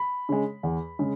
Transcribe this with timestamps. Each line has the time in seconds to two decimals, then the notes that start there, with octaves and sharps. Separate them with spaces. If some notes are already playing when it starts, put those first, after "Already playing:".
Already playing: B5
0.29 C#3 G#3
0.63 E2
0.99 C#3 G#3